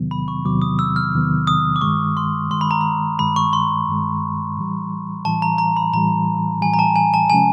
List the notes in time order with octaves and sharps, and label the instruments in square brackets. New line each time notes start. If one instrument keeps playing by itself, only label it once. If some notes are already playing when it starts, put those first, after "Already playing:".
Already playing: [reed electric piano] E2 C3 D#3 F#3 B3
[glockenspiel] B5
C#6
[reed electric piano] E2 C3 D#3 F#3 B3 [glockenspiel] D6
[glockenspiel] D#6
E6
F6
[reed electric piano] E2 C3 D#3 F#3 B3
[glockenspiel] D#6
D6
[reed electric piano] G2 D#3 G#3 [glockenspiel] C#6
[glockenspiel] C6
[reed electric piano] G2 D#3 G#3 [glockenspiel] C6
[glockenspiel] B5
A#5
B5
[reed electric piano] G2 D#3 G#3 [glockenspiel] B5
[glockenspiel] C#6
C6
[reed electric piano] G2 D#3 G#3
A2 E3 G3
[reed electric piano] A2 E3 G3 [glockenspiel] A5
[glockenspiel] A#5
A#5
B5
[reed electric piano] A2 E3 G3 [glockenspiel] A#5
[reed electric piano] A2 E3 G3 [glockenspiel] G#5
[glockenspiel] A#5
A5
G#5
A5
[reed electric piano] C3 F3 G#3 C#4 [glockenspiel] G#5